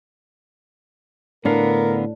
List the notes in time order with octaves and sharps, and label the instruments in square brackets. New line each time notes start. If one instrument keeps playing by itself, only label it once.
[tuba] A2 [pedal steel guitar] D3 B3 F5 [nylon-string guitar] D4 [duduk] A#4